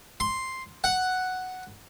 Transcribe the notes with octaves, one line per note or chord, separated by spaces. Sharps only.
C6
F#5